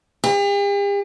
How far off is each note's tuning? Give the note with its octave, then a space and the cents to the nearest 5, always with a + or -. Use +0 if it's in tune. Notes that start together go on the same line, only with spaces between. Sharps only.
G4 +45